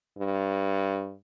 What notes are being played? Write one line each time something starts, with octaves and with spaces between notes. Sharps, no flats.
G2